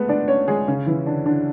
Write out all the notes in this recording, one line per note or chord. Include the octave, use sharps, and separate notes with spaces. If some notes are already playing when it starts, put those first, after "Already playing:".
Already playing: G#3 A3 B3 A4 B4
D4 D5
C#4 C#5
G#3 G#4
C#3 C#4
E3 E4
D3 D4
D3 D4